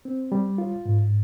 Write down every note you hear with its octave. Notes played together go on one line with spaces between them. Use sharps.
C4
G3
F4
G#2